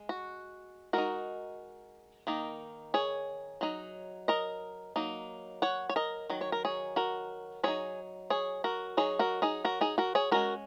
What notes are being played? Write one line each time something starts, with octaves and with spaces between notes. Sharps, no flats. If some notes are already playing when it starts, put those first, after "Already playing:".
Already playing: G#3
F#4
G#3 D#4 F#4 A#4
D#3 A#3 D#4
G#4 C#5
F#3 D#4
A#4 D#5
F#3 A#3 D#4
C#5 F#5
C#5
A#4 D#5
D#3 F#3
C#5
A#4
G#4 C#5
F#4 A#4
F#3 D#4 G#4 C#5
G#4 C#5
F#4 A#4
F#3 D#4 G#4 C#5
F#4 A#4
D#4 G#4
F#4 A#4
D#4 G#4
F#4 A#4
G#4 C#5
G#3 C#4 F#4 A#4